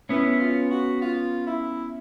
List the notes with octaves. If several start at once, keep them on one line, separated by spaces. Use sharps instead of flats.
B3 C#4 E4
F4
F#4
F4
E4